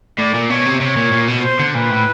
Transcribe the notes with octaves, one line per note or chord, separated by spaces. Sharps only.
A2 D5
A#2
B2 C#5
C3
C3 C#5
A#2
A#2
B2
C5
D3
A#2 B4
A2